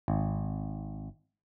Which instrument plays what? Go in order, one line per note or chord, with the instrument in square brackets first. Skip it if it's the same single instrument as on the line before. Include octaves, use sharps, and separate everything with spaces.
[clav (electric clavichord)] G#1